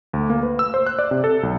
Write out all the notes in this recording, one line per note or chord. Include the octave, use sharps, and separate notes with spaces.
D2
A#3
B4
E6
C5
F#6
D5
C3
A4
B1